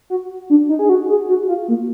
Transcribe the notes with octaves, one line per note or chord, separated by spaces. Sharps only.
F#4
D4
D#4
G#4
F#4
G#4
F#4
F4
A#3